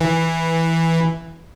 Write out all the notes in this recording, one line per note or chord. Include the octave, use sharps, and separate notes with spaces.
E3